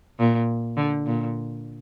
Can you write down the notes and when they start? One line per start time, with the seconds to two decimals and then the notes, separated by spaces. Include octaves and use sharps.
0.19 A#2
0.77 D3
1.06 A#2